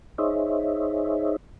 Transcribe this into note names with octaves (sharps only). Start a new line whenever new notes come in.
D#4 G#4 C5 C#5 D#5 E5